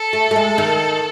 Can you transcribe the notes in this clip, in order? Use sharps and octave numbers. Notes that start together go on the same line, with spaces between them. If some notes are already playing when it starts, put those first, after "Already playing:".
Already playing: A4
A3
A3
G#3
D#3